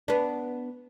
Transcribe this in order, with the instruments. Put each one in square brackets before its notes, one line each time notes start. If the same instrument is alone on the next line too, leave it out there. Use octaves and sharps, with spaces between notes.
[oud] B3 D4